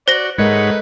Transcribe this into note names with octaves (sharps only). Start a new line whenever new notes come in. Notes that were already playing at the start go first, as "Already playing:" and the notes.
F#4 C5 D5 A#6
G#2 G#3 A3 A#4 B4 C#5 D#5 F#5